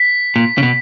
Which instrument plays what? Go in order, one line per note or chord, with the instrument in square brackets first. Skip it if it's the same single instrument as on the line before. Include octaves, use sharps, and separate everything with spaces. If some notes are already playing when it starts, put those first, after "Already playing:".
Already playing: [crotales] B6
[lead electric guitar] A#2
C#3
B2